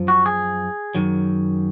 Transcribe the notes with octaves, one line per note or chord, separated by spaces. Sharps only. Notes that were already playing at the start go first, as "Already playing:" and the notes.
Already playing: F#2 F3
F#4
G#4
F#2 D#3 F#3